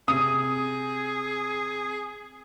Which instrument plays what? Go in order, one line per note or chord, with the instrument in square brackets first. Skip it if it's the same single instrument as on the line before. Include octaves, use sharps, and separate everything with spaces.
[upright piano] C3 [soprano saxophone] G#4 [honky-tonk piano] D#6